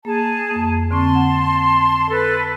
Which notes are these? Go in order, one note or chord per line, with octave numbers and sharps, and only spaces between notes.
A#3 G#4 A5
F2 A#3
D3 C4 A5 C6 C#6
F#5
A4 B4